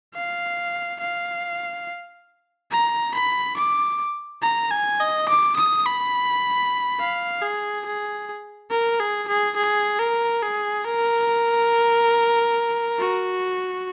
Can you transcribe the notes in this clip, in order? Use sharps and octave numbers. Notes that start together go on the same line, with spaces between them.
F5
F5
A#5
B5
D6
A#5
G#5
D#5
D6
D#6
B5
F5
G#4
G#4
A#4
G#4
G#4
G#4
A#4
G#4
A#4
F#4